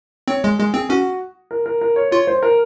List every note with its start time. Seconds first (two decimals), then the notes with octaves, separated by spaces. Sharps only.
0.28 C4 C#5
0.44 G#3 G#4
0.59 G#3 G#4
0.74 C4 G#4
0.89 C#4 F#4
1.51 A#4
1.66 A#4
1.81 A#4
1.96 C#5
2.11 F4 C#5
2.27 C5
2.43 A#4